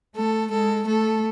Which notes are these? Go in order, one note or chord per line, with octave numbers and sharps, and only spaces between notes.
A3 A4
G#3 A4
A3 A4